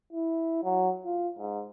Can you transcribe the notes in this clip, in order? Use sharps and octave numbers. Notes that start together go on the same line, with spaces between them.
E4
F#3
F4
G#2